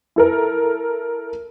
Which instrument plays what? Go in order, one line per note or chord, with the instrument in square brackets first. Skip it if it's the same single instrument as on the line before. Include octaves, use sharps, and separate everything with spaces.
[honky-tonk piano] E4 A4 A#4